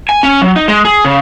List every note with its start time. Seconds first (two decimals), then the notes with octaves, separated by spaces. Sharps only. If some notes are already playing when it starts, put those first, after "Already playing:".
0.09 G#5
0.23 C#4
0.42 F#3
0.56 D#4
0.68 G#3
0.85 G#4
1.05 C#3